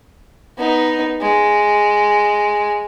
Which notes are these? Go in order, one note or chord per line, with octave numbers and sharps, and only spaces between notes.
B3 D#4
G#3